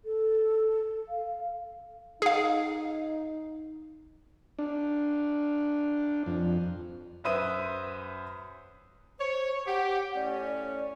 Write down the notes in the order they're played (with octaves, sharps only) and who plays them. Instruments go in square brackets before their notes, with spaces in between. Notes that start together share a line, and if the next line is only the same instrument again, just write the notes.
[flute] A4
F5
[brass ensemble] D#4 [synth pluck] G#4 F5
[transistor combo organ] D4
F2
[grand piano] F#2 B4 C5 E5 D#6 D#7
[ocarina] C5 [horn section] C#5
[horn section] G4 [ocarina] F#5
[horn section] A2 C#4 [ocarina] D5